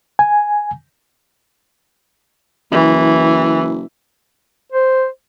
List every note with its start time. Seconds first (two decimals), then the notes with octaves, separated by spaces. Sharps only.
0.19 G#5
2.72 F#1 E3
4.72 C5